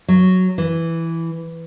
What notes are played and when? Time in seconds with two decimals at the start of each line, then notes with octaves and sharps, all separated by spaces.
0.08 F#3
0.58 E3